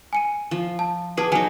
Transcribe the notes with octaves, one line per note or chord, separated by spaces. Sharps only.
G#5 C#7 D#7
F3
A5
G4 G#4 B4 A5
F#3 D#4 G#5